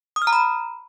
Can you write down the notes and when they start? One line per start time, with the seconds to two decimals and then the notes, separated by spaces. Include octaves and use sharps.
0.16 D#6
0.22 F6
0.27 A#5
0.33 B5